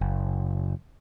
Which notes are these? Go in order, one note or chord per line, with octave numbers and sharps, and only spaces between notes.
F#1